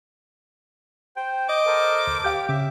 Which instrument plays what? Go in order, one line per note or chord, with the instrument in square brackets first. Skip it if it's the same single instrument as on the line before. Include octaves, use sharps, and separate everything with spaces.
[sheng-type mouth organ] C5 [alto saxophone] G5
[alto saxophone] D#5 [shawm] D6
[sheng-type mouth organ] A4 A#4 C5
[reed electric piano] D2
[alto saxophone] G4 [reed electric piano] F5 G6
[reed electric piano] C#3 [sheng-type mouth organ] E5